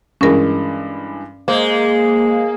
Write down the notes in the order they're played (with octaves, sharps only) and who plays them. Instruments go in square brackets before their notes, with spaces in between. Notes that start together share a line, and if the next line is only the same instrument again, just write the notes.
[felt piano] G2 E3 G#3 [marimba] C#4 A#4
[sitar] G#3 [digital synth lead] A#3 [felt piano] C5